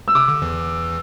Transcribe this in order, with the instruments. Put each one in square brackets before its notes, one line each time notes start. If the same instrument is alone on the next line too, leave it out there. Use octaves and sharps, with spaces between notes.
[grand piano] E6
[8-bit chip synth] C3 [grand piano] D6
[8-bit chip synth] D3
E2 E3